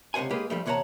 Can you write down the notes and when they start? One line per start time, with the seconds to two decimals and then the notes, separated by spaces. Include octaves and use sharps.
0.14 C#2 C3 C5 F#5 G#5
0.31 G#3 A#3 G4 G#4 B4
0.50 F3 G3 A3
0.66 E2 C3 C#5 F#5 A5 A#5